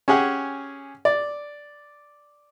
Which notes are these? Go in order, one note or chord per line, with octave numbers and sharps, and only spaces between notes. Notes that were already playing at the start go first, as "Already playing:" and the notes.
C#4 G4 G#4 F#5
D5